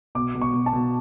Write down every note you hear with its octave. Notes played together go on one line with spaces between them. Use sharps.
B2 D6
B2
C#6
B2
A5
B2